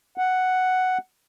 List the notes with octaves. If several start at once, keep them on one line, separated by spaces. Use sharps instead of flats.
F#5